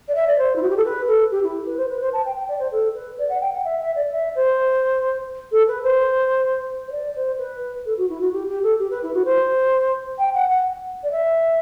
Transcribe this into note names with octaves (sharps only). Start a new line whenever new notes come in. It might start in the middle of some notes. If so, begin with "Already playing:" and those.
D5
E5
D5
C5
E4
F#4
G4
A4
B4
A4
G4
E4
B4
C5
B4
C5
A5
G5
G5
D5
C5
A4
B4
D5
F#5
G5
F#5
E5
E5
D5
E5
C5
A4
B4
C5
C5
D5
C5
B4
A4
F#4
E4
F#4
G4
G4
A4
G4
B4
E4
F#4
C5
G5
F#5
F#5
D5
E5